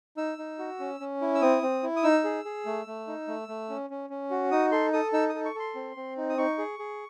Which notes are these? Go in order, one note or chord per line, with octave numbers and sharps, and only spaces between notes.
D#4 E6
D#4
F#4
C#4
C#4
E4
E6
C4 D#6
C4
E4
D#6
D#4 E6
G#4
G#4
A3
A3
D#4
A3
A3
C#4
C#4
C#4
F#4
D#4 D#6
A4 C6
A4 D#6
D#4 E6
D#6
A4
C#6
A4 C6
C4
C4
D#4
D#6
D#4 C#6
G#4
G#4